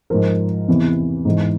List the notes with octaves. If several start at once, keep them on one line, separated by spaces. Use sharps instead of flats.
G#2 F3 A#4 C5
E2 C3 E3
G#2 E3